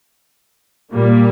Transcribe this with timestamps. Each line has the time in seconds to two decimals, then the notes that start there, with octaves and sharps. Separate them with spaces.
0.93 A#2 G3 A#3